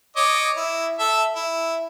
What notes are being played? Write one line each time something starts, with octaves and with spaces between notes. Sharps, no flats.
C#5 D#5 D6
E4
A4 E5
E4